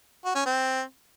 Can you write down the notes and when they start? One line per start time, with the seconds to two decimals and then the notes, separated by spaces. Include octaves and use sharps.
0.25 F#4
0.35 C#4
0.46 C4